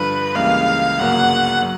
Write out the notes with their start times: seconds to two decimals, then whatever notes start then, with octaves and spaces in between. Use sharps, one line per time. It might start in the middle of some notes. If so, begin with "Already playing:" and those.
Already playing: G2 D3 F3 B4
0.35 C#2 C#3 E3 G3 A#3 F5
0.99 G1 F#2 C#3 F#3 A#3 F#5
1.62 F#3